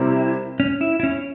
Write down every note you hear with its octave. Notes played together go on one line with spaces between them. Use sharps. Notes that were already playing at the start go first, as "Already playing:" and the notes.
Already playing: C3 G3 C4 E4 G4 A#4
C#4
E4
E4
C#4